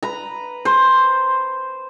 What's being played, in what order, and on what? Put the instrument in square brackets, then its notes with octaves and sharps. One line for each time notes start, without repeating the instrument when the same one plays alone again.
[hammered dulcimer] B4 A#5
C5